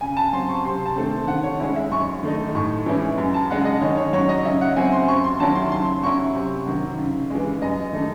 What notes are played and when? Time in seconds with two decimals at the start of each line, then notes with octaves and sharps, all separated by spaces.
0.01 C#3 G#5
0.17 A5
0.33 F#3 C4 C6
0.49 C#6
0.64 C3 C6
0.85 A5
0.96 D#3 A3 C4
1.28 D#3 F#5
1.43 C#5
1.60 G#3 C#4 E4 C#5
1.76 E5
1.91 F#2 C#6
2.23 D#3 A3 D#4
2.55 A2 C#6
2.86 E3 G#3 C#4 E4
3.18 F#2
3.34 A5
3.50 C#3 G#3 D#4 F#5
3.65 D#5
3.81 D#3 C#5
3.97 C#5
4.13 F#3 C#4 C#5
4.29 D#5
4.44 C#3 E5
4.61 F#5
4.76 F#3 C4 E4 G#5
4.92 C6
5.08 F#2 C#6
5.24 C6
5.40 D#3 F#3 C#4 E4 A5
5.55 C6
5.71 C#3 C6
6.03 F#3 C#4 E4 C#6
6.35 C3
6.66 D#3 F#3
6.98 C#3
7.30 E3 G#3
7.62 F#2 D#5
7.93 D#3 A3 D#4